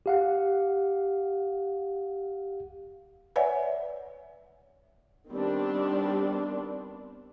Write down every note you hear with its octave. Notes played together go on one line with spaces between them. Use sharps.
G4 F5 F#5
B4 C#5 D5 E5 F#5 G#5
D#3 G3 B3 C4 D4